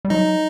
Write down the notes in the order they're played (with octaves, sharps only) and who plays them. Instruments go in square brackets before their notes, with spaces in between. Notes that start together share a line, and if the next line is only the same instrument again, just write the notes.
[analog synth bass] G3
[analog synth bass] F#3 [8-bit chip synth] D#4